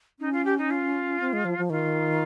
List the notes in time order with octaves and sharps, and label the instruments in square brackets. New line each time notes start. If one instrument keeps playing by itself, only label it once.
[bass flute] C#4 [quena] D#4
[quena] F4
G4
D#4
F4
[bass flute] C4
G#3
F3
F3
[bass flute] D#3 [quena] F4